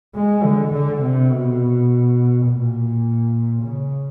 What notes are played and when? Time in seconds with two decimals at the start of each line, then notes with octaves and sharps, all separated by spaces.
0.15 G#3
0.44 D3
0.73 D3
1.02 C3
1.31 B2
2.47 A#2
3.63 C#3